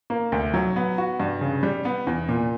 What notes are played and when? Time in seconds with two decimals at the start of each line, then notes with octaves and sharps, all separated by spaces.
0.10 A#3
0.32 D2
0.54 F#3
0.76 B3
0.98 F#4
1.20 G2
1.41 C#3
1.63 G3
1.85 B3
2.07 E2
2.29 A#2